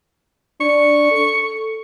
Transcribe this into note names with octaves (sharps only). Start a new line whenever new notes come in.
D4 C#6
A4